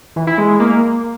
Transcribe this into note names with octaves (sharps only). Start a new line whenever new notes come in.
E3
E4
G#3
G#3
A#3